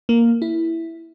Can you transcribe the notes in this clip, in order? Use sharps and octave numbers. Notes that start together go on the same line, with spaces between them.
A#3
E4